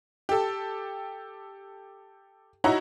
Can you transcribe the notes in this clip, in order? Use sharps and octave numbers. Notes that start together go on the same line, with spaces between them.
G4 A4
D#4 E4 F#4 C#5 A#5